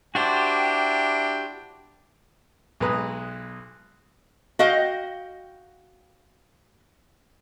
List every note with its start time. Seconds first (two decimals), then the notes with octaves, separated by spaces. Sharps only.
0.15 D4 E4 F#4 G4 C5 G5
2.80 B1 G#3 B4 A#5 D#6
4.59 F#4 D#5 F5 G5